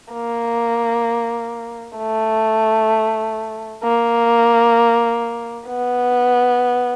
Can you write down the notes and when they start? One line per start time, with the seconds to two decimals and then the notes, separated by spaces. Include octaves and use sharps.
0.13 A#3
1.98 A3
3.84 A#3
5.68 B3